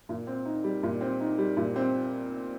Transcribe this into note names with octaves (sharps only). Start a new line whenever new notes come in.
A#2
C4
D#4
G3
A#2
C4
D#4
G3
A#2
C4